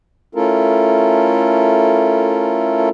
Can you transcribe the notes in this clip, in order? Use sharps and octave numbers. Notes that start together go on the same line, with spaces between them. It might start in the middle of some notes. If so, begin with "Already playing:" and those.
A3 C#4 E4 F4 A4 A#4